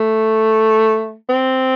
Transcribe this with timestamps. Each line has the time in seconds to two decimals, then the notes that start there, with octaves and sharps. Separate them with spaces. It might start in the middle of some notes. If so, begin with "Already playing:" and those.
Already playing: A3
1.29 C4